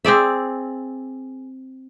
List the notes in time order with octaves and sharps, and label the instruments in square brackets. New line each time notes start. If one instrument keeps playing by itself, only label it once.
[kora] C4 G#4 D5 E5